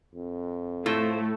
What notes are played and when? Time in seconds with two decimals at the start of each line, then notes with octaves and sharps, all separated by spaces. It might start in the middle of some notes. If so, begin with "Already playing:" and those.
0.15 F2
0.86 A2 A3 F4 C5